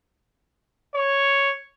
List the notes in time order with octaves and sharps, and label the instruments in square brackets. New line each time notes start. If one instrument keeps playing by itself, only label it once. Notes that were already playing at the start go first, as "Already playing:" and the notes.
[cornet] C#5